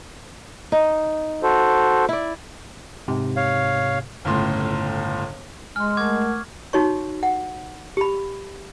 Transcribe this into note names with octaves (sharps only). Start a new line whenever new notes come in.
D#4
F#4 A4 C5
E4 D5
G#2 C3
C#5 F5
G1 C#2 A2 C6
G#3 G#5 C6 F6
A3 A#4 F#5 C#6 D6 G#6
D#4 F#4 C#5 C#6
F#5
G4 B5